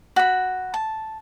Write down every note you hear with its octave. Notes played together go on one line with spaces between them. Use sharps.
F#4 B5
A5